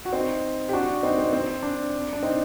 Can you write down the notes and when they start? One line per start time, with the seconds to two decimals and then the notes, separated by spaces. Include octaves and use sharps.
0.05 F#4
0.13 C4 D#4
0.69 G4
0.73 D4 F#4
1.03 C4 D#4
1.18 C4
1.33 C4
1.63 D4
2.13 D4
2.23 C4 D#4